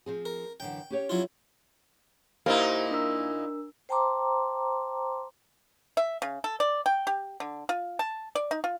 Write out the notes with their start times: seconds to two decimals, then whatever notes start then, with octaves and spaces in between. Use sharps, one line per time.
0.06 F3 C4 G#4
0.25 A#4
0.60 F#2 D3 E3 G5
0.90 C#4 G4 C#5
1.09 F#3 E4 F4
2.46 A#2 A#3 D#4 E4 G4 C5
2.91 D4 A#4 E6
3.89 C5 G5 A5 A#5 C6 D6
5.97 E5
6.22 C#3
6.44 A4
6.60 D5
6.86 G5
7.07 G4
7.40 D3
7.69 F4
7.99 A5
8.35 D5
8.51 D#4
8.64 F4